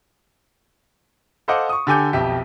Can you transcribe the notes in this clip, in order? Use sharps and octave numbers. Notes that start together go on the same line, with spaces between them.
A4 C5 D#5 F5 F#5 D6
C#6 D#6
D3 G4 A4 G#5 D6 G6
B1 F2 B2 G4 E5